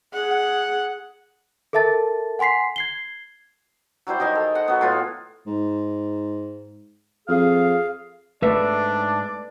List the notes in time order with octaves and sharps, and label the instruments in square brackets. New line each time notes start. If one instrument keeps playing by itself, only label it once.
[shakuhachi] G#4 [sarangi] F#5
[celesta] A4 A#4 E5 A5 A6
F#5 G#5 C6 B6 C7
G#6 C7 G7
[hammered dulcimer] F#3 G3 E4 C5
D#3 D#5 F5 G#5
A4
F#5
F#3 B3
A2 F4 B4 G#5
[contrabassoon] G#2
[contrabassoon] F2 [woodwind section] G#4 F5
[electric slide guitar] G#2 E5 [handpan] A3 B4 [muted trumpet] D4 [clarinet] D5